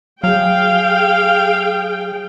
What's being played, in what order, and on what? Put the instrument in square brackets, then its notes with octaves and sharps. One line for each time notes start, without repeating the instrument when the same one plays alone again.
[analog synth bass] F#3 [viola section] G#4 G5 [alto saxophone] F5